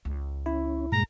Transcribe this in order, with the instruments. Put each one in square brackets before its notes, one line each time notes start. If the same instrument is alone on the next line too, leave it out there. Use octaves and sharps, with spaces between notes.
[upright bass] C#2
[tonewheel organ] C#4 [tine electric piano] E4
[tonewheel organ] G2 A#2 G#3 [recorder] A#5